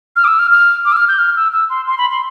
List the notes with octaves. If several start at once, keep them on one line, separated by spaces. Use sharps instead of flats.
F6
D6
E6
F6
F6
D6
E6
F6
G6
F6
E6
E6
C6
C6
B5
C6